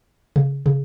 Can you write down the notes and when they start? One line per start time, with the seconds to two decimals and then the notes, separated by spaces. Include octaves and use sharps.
0.36 C#3
0.66 C#3